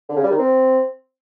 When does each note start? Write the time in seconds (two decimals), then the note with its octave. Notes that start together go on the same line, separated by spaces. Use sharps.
0.09 D3
0.16 C#3
0.23 G3
0.31 D#3
0.38 C4